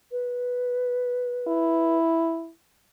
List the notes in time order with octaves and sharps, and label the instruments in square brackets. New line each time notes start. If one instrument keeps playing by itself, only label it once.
[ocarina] B4
[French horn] E4